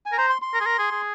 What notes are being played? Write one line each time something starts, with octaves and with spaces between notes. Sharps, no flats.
G#5
A#4
C5 A#5
C6
C6
A#4
G#4
A#4
G#4
G#4